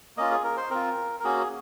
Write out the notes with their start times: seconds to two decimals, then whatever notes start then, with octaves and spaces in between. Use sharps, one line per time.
0.17 A#3 C#4 F4 D#5
0.31 G#4
0.44 A#4
0.57 C5
0.70 C4 F4 A#4
1.20 A#4
1.24 A#3 C#4 F#4 G#4